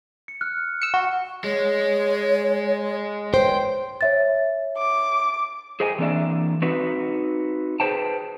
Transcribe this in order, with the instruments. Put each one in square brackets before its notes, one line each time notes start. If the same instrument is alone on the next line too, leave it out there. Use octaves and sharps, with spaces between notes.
[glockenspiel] C#7
F6 F#6
[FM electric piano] E6 C#7
[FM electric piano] F#4 [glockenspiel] C#6
[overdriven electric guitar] G#3 [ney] C#5
[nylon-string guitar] C5 [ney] C#5 [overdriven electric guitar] G5
[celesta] C#5 E5 A6
[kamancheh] D6
[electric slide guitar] G#4 C5 D#5 G5 G#5
E3 A#3 C4 D4 D5 E5
C4 D#4 F#4 B4
G#4 B4 C5 G5 A5